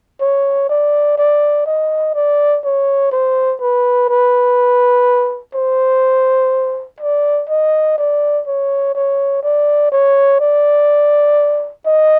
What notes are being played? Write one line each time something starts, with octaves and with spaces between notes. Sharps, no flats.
C#5
D5
D5
D#5
D5
C#5
C5
B4
B4
C5
D5
D#5
D5
C#5
C#5
D5
C#5
D5
D#5